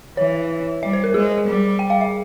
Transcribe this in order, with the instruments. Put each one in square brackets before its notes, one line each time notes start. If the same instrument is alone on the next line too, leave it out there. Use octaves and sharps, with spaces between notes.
[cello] E3 [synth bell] C#5
[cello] G3 [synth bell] E5
[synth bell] C5
A#4
[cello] G#3 [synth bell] G#4
[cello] G3
[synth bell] G5
F5
E5